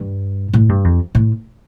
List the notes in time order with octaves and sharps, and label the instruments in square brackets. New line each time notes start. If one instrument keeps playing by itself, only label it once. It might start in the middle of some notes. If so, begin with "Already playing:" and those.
Already playing: [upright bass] G2
A2
G2
F2
A2